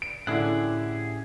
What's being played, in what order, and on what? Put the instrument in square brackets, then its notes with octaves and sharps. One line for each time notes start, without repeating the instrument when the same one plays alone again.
[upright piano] D7
[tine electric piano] A2 C#4 [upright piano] D3 E4 [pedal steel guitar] G4 G#4 F#5